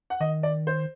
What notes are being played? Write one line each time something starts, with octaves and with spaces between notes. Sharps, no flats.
F#5
D#3 D#5
D5
C5